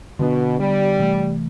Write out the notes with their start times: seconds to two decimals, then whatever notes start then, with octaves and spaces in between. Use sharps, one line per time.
0.19 B2 D3 F#3 B3 D4
0.59 G3
0.99 C3 E3 A3